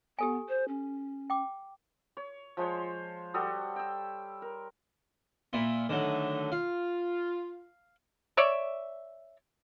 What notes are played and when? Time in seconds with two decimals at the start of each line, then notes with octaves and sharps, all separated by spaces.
0.19 B3 G4 A4 G#5
0.49 C5
0.68 C#4
1.30 G5 D6
2.17 C#5
2.57 F3 G#3 C5 C#5
3.34 G3 F#4 A4 D#6
3.76 G5 E6
4.42 A#4
5.53 A#2 E4 F4
5.89 D3 D#3 F#3 A3
6.52 F4 F5
8.37 C#5 D5 E5